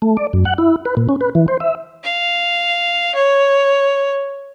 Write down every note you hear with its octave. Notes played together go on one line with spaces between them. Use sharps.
A3
D5
F#2
F#5
E4
B4
A#2
C#4
B4
E3
C5
E5
F5
C#5